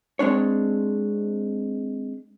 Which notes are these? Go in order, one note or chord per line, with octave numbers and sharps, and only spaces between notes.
G#3 C4 D4 C#5